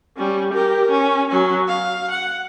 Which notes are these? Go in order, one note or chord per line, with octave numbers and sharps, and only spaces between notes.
G3 C#4
G4 A#4
C#4
F#3 C#4
F5
F#5